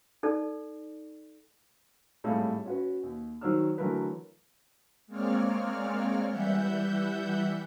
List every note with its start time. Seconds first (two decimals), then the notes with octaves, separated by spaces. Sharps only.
0.23 D#4 A4 D5
2.24 G#1 A2 G3 A4 C#5 F5
2.66 C#4 F#4 B4
3.03 D#2
3.41 D#3 F#3 C5 C#5 E6 F6
3.78 D3 E3 F#3 A3 A#4 B4
5.07 G#3 A#3 C4 C#5 D5 F6
6.29 E3 G3 E5 F#5 G6